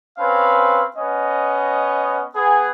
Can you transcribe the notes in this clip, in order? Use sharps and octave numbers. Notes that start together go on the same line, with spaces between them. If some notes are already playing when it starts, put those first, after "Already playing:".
C4 C#4 B4 F5
B3 C#4 D#5
B3 G#4